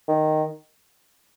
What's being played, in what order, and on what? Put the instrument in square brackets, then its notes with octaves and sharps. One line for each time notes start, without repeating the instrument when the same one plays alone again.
[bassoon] D#3